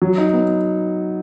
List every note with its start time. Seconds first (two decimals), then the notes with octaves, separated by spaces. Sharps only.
0.02 F#3
0.18 D#4
0.33 B3